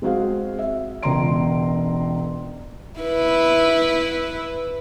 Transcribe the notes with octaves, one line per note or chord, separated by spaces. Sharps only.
G#3 C4 F#4 G#4 F5
E5
E1 C#2 A#5 C6 D7
E4 B4